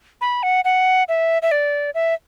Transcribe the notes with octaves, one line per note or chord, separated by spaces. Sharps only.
B5
F#5
F#5
E5
E5
D5
E5